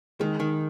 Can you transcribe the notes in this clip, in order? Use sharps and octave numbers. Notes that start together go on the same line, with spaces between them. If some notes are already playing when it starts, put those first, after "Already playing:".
D#3 G#3
D#3